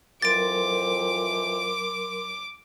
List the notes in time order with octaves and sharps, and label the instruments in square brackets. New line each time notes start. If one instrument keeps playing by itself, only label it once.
[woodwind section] F2 E3 [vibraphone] F#3 A#4 C6 [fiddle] D6 [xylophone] A6 D7